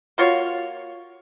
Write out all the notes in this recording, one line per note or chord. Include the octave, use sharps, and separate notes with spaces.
A#3 F4 F#4 C#5